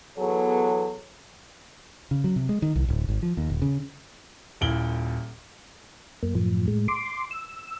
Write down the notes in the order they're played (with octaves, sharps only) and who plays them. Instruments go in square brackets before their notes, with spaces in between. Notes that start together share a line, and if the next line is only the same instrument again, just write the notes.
[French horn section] E2 F#3 B3 G#4 A4 C#5
[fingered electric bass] C#3
F#3
C3
G#3
D#3
C2
D1
G#1
F3
D#2
D#1
C#3
[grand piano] D#1 A#2 E4 D7 F#7 G7
[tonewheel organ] F#2 A#3
F#2 A2 F3
A2 G#3
C6 D6
E6